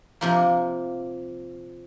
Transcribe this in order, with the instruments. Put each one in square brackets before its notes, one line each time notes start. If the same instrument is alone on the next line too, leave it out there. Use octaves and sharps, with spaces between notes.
[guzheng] C3 F3 A#3